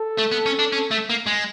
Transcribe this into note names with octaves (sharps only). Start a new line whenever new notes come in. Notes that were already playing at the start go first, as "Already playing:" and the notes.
Already playing: A4
A3
B3
C#4
D4
C#4
A3
A#3
G#3